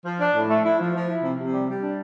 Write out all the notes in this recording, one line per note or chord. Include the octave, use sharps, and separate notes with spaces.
F3
D4
A2
A3
E4
F3
F3
E4
C3
C3
G3
G3
D4